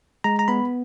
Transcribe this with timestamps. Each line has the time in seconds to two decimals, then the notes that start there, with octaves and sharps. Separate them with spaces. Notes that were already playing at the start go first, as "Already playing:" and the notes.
0.24 G#3 A#5
0.39 A#5
0.48 B3 B5